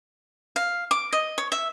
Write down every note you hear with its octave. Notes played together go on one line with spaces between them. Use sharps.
F5
D6
D#5
C#5
E5